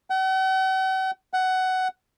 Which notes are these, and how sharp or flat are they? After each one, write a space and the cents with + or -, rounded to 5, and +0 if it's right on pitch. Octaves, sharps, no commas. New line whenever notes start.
F#5 +45
F#5 +15